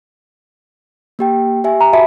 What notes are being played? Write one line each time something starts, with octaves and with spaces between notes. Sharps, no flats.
A#3 G4 G5
G4 E5 G#5
A#5
F#4 E5 A5 B5